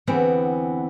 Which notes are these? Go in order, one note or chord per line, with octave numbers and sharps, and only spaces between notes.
E2 D3 E3 B3 C4